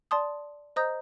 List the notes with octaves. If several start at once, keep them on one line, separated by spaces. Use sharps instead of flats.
D5 A5 C6 D#6
C5 D#5 A#5 D#6 G6